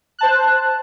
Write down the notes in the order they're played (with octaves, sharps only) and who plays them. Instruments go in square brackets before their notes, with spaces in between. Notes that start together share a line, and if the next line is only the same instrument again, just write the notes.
[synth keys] C5 A5 F#6